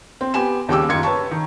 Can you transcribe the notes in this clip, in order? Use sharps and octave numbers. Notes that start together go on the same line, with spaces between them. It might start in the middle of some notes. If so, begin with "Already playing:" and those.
C4
B3 G4 G#5 E7
D#2 C#3 G3 G5 D6 E6
F#1 D#3 F4 G#6 C#7
B4 C#5 A5 C#6
D#3